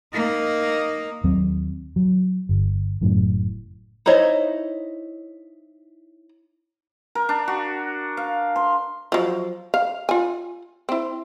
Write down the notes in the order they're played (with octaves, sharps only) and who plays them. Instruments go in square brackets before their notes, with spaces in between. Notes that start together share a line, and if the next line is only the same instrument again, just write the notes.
[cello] A#3 D#4
[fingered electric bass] D#2 F#3 C4
F#3
G1
F#1 F#2 A2
[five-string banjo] D#4 E4 C5 C#5 D#5
[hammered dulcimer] A#4
D4
F#4
F5
C6
[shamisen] F3 F#3
F5
F4 G#5
C4 E4